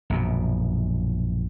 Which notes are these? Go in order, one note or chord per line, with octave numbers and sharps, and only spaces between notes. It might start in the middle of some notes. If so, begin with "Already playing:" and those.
A#1 F#2 B2